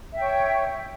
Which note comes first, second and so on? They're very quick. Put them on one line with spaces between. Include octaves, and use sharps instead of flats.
E5 G5 C#5